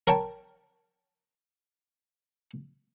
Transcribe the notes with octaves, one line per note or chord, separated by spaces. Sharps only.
A#4 C#5 G5 A5